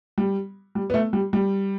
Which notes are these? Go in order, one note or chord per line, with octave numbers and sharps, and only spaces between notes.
G3
G3
B3
A3
G3
G3